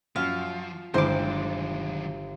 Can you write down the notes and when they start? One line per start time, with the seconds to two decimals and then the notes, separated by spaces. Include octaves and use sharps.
0.16 F#2 F3 F5
0.94 G1 D#3 E3 F#3 G#3 C5 D6 D7